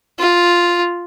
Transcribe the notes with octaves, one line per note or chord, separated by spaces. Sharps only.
F4